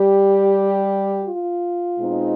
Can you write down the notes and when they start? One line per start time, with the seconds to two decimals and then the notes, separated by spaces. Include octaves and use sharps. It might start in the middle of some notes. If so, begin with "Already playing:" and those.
Already playing: G3 G4
1.22 F4
1.97 B2 G#3 C4 D#4